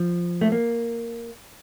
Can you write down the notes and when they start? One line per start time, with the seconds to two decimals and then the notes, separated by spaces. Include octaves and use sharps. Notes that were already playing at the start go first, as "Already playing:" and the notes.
Already playing: F3
0.41 A3
0.52 A#3